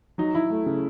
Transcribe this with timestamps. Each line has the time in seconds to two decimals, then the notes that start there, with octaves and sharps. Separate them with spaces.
0.18 F#3 D#4
0.35 F#3 E4
0.50 A3
0.66 C#3